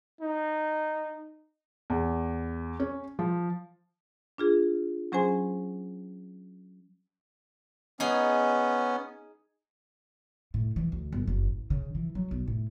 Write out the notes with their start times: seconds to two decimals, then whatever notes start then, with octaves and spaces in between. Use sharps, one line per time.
0.21 D#4
1.90 E2
2.80 C#4
3.19 F3
4.38 D4 F4 G#4
5.12 F#3 C#4 G#4 C5 G#5 C6
8.00 B3 C#4 D#4 G#4 G#5
10.54 A2
10.76 E3
10.92 D2
11.13 G1
11.28 F#1
11.43 A1
11.70 C#3
11.95 E3
12.15 F#3
12.31 B1
12.48 A2